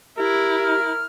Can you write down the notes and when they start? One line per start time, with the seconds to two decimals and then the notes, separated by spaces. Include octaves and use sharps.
0.18 E4 G4 A#4
0.62 F6